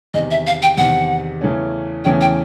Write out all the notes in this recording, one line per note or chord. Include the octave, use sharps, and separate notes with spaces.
E2 C3 D#3 D#5
E5
F5
G5
E2 C3 D#3 F#5
E2 C#3 E3 A3 C#4
E2 C#3 E3 A3 C#4 G5
G5